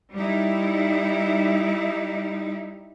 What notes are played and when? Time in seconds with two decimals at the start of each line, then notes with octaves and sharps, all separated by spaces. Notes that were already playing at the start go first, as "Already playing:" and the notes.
0.14 G3 D#4 E4